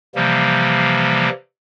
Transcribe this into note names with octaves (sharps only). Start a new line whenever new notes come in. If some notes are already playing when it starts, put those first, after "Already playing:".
C3 E3 F3 G3 A#3